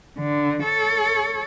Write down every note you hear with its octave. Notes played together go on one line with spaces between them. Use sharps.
D3
A4 C#5